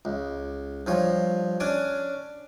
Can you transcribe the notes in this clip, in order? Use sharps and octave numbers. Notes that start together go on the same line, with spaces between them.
C#2
G2 F3 C#5
C#4 D4 G#5 D6